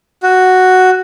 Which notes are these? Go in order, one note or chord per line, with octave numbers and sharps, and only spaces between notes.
F#4